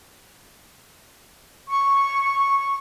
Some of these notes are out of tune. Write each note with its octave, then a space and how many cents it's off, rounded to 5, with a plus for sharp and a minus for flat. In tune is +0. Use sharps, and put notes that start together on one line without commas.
C#6 -5